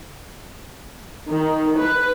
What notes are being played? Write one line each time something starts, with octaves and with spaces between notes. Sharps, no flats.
D#3
B4